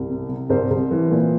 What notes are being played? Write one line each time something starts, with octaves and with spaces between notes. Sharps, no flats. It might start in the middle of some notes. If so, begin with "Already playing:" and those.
Already playing: C2
C3
C3
C2 A#4 C5
C2
E3
A#2